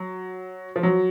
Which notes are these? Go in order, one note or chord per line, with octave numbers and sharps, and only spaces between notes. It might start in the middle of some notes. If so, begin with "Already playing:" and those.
Already playing: F#3
F3
F#3